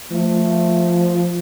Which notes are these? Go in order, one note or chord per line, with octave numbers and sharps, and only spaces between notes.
F3 A3